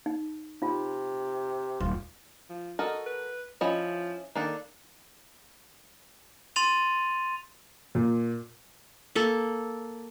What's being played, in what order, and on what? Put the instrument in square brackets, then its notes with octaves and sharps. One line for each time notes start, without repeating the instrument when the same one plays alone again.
[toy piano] D#4
[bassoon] C3 [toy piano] D#4 F4
[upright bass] D#1 [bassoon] F4
[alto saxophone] F3
[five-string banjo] F#4 A4 A#4 [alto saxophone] D#5
[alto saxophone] B4
[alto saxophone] F3 [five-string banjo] C#4 E4 D#5
[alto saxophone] D#3 [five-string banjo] A#3 D4 A4
[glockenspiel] C6 A6 D#7 F7
[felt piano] A#2
[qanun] A#3 A4